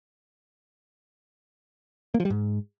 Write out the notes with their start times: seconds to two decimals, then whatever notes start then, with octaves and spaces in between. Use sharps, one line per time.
2.14 A#3
2.20 F3
2.25 G3
2.30 G#2